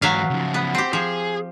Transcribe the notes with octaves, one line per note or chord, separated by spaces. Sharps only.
G#2 E3 F#3 E5 F5
C#3 F3
B3
C4 G4 C5
F3 G#4